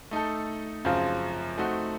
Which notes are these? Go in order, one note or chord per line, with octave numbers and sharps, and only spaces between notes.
A3 D#4 A4
F#2 C#3 F3 C4 F4
A3 C4 D#4 F#4